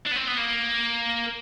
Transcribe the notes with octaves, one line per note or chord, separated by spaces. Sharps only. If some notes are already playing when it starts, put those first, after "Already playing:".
D4
B3
C4
B3
A#3